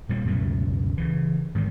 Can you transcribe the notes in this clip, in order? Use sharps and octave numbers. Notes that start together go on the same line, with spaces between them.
A#2 G3 A#3
C#2 F#2 B2 A3
C#3 E3
G#2 D#3 E3